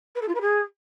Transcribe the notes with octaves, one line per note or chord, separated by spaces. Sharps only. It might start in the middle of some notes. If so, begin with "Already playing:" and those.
B4
A4
F4
B4
G#4